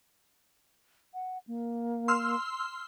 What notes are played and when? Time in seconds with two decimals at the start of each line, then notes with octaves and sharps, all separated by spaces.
1.14 F#5
1.47 A#3
2.08 C6 E6 F6